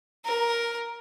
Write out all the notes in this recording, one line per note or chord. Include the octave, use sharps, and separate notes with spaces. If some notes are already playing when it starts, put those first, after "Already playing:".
A#4